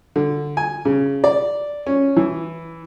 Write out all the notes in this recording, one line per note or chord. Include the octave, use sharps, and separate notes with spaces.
D3
G#5
C#3
D5
C#4
E3